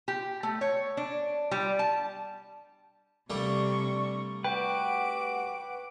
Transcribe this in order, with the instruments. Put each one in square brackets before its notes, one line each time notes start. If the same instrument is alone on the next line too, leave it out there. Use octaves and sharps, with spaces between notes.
[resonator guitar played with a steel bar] G4
A3
C#5
D4
G3
A5
[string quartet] C3 D4 C#6 [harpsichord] G3 A3 A#3
[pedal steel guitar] F#4 B4 [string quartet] F#5 D6 [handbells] G5